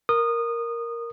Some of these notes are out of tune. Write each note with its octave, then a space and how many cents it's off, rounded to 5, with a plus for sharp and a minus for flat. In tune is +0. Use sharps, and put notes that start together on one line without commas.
A#4 +0 D#6 -20